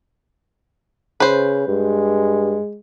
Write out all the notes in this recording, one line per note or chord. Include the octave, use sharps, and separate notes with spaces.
C#3 B4 C5
G2 G#3